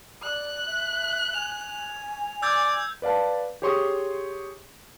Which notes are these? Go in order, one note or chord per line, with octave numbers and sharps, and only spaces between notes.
D5 F#6
E5
G#5 F7
D5 E6 G6 G#6
B4 D5 F5 A5
G4 G#4 C#5 C6 C#6 D#6